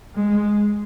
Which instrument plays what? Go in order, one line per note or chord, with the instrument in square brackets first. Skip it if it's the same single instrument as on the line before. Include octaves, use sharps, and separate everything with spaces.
[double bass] G#3